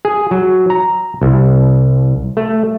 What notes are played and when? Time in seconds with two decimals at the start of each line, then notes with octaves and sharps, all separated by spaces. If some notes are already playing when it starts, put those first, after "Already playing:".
0.05 G#4
0.31 F#3
0.70 A#5
1.22 C2
2.37 A3